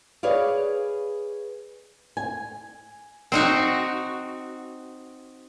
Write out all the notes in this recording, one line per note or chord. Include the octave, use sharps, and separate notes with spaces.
G#4 B4 C#5 D5 F5
G#5
C4 D#4 F#4